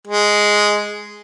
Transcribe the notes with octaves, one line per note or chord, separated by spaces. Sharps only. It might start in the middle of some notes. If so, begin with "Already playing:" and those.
G#3